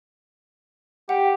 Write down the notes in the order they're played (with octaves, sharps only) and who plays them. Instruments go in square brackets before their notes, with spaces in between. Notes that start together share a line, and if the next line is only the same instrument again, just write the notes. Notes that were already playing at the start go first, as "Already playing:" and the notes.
[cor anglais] G4 [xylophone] F#5